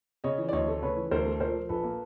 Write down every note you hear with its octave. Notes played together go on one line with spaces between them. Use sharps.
C#3 C#5 D#5
E3
D5
D2 C#5 D#5
A3
C#3 B4 C#5
E3
D2 A#4 C5
A3
A#2 A#4 C5
F3
A#1 A4 B4
A#3